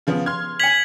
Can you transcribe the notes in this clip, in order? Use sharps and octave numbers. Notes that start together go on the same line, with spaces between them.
C#3 F3 B3
C6 F6 G#6
G#5 G#6 B6 C#7 F7 F#7